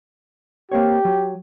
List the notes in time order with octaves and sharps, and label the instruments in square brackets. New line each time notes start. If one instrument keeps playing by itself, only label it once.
[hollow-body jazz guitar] A#3 C4 C#5 [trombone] G4
[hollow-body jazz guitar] F#3